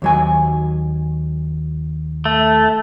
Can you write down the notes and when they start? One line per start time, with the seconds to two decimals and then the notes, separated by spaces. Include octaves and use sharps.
0.02 D#2 F#3 G#5
2.25 A3